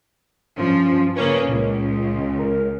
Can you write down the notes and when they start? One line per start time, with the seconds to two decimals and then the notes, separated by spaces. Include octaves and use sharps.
0.57 G2 F3 C#4
1.16 C#3 A#3 C#4 B4
1.49 C#2 A#2
2.38 A#4